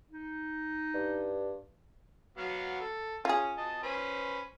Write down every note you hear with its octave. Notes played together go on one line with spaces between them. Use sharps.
D#4
G2
F#3 B3 F5
A4
C#4 F4 G#4
D#5 A5
C#4 B4 C5